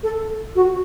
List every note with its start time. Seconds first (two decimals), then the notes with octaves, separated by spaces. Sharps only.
0.03 A4
0.55 F#4